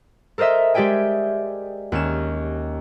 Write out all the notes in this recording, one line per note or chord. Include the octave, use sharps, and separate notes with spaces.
A4 A#4 C5 D#5 E5
G#3 G4 D5 E5 G5 G#5
D#2 C#4 E7